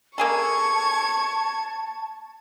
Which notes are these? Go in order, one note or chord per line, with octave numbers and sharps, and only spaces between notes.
A#3 G#4 A4 A5 C#6 G#6